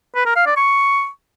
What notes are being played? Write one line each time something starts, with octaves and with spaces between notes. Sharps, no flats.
B4
A#4
F5
D5
C#6